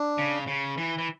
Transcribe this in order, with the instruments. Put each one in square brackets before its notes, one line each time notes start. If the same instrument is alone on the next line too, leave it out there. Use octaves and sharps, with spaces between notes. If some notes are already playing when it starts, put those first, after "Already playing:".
Already playing: [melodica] D4
[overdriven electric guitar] C#3
C#3
E3
E3